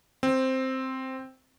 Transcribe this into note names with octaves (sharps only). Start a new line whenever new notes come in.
C4